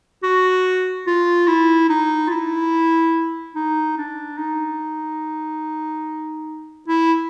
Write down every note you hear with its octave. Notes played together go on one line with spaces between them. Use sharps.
F#4
F4
E4
D#4
F4
E4
D#4
D4
D#4
E4